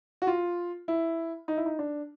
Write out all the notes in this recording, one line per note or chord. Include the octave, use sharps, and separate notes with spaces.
F#4
F4
E4
D#4
E4
D#4
D4